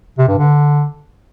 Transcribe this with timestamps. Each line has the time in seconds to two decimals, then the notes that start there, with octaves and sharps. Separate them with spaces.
0.19 C3
0.29 G2
0.39 D3